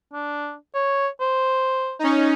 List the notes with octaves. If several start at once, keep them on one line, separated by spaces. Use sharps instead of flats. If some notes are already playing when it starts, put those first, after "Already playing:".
D4
C#5
C5
C#4 D#4